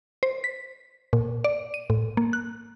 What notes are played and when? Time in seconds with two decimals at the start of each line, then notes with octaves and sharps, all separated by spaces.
0.23 C5
0.44 B6
1.13 A#2
1.44 D5
1.74 D#7
1.90 A2
2.17 A#3
2.33 F#6